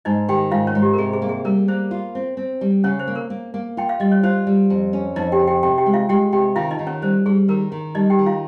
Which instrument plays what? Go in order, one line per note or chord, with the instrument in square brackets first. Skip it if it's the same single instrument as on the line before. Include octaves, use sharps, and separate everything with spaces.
[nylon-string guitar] G#2 [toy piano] D#4 D#5
[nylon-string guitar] D#3 [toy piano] G4 G5
[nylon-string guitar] G#2 [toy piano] F4 F5
[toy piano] C#4 C#5
[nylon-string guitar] G#2
[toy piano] G4
A#4
[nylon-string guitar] C3 [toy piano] G#4
[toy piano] G#4
[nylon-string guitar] A#3
[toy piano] G#4
[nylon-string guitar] G3 [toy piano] A#4
[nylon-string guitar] A#3 [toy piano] C5
[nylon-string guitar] F4
C4
C4
G3
[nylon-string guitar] C#3 [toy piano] C#4 C#5
[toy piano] C5
[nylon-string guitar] A#3
[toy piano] A#4
[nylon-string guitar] A#3
A#3
[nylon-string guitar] F4 [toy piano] G5
[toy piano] F5
[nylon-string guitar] G3 [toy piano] D#5
[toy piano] C#5
[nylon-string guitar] F4 [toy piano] C5
[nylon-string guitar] G3
F2
C#4
[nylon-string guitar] F2 [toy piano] D#4 D#5
[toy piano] G4 G5
[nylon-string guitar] C#3
[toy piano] G4 G5
[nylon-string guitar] C3 [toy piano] G4 G5
[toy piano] G4 G5
[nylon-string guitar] G#3
[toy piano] F4 F5
[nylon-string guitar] G#3 [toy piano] G4 G5
[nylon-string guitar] C3 [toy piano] G4 G5
[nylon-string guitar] D#3 [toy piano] F4 F5
[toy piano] D#4 D#5
[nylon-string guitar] D#3
[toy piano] C#4 C#5
[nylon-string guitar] G3 [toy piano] C5
[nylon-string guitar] G3 [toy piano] G#4
[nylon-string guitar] D#3 [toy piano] A#4
[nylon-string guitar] D#3
[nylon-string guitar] G3 [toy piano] D#4 D#5
[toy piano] G4 G5
[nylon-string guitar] D#3
[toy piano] F4 F5